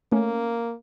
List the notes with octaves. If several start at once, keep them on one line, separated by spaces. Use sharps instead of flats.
A3 A#3 C#4